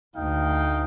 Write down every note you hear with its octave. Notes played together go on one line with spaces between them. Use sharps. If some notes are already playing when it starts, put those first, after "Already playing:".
D2 D#4 F5 G5